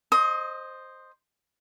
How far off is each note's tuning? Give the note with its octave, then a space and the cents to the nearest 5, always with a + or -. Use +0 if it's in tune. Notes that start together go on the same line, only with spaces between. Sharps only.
C5 +5 D#5 -10 D#6 +30